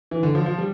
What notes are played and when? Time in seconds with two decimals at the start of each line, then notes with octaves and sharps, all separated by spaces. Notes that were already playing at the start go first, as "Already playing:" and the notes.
0.11 E3
0.23 D3
0.35 F3
0.46 F3
0.58 G3